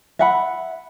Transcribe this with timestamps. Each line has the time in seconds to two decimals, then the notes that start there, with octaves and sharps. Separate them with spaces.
0.19 E5 F#5 B5